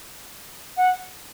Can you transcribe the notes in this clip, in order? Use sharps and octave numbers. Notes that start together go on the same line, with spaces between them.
F#5